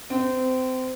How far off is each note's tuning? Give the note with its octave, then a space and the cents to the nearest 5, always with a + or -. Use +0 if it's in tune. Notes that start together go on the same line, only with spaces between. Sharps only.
C4 -25